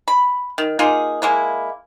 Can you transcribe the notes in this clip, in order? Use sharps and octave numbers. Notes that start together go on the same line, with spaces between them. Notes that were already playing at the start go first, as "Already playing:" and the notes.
B5
D#3
A#3 D#4 F4 G#4
G#3 A#3 E4